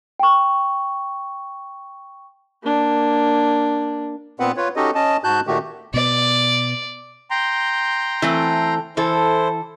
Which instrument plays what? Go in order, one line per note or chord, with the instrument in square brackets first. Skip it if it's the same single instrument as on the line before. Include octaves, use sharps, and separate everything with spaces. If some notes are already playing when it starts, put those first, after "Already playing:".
[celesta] G5 C#6
[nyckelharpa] A#3 D4
[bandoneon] A#2 B3 C4 B4 F#5
F4 B4 C#5
C#4 D#4 F#4 G4 A4 D#5
C#4 D#5 A5
G#2 F#4 A5 F#6 G6
A#2 D#3 A3 F#4 G4
[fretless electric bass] B2 B3 [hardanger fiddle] D5
[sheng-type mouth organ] G5 A#5 C6
[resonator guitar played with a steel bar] E3 A3 C4
[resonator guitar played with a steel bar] E3 A4 [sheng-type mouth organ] E4 C5